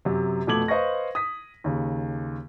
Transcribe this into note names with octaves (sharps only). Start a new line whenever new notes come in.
F#2 C3
F2 B2 A3 D6 G#6 F#7
B4 C5 D#5 F5 C#6 A#6
D#6 B6
D#2 C#3